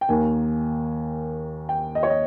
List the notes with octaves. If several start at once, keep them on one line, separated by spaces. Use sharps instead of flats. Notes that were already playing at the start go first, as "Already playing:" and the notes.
G5
D#2 D#3 A#3 G#5
G5
D#5
C#5
D#5